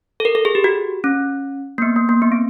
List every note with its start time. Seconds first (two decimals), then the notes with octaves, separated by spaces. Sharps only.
0.20 A4
0.25 A#4
0.35 A4
0.45 G#4
0.55 G4
0.64 F#4
1.04 C#4
1.78 A#3
1.82 B3
1.96 A#3
2.09 A#3
2.22 B3
2.32 C4